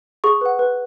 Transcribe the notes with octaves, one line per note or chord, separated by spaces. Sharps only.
G#4 C#6
B4 F#5
B4